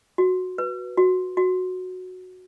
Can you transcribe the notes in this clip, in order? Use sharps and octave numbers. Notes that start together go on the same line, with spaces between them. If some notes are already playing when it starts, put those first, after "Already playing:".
F#4
B4
F#4
F#4